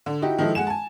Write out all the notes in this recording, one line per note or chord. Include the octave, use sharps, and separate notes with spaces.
D3
D#4 E4 F#4 G4
D#3 F3 G#3 D#4 E4 A4
G#3 F#5 G#5 E7
G#5 A5